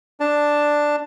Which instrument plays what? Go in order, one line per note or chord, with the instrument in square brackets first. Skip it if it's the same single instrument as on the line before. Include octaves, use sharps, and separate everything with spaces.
[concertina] D4 A5